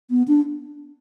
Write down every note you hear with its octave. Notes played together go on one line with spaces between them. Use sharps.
B3
D4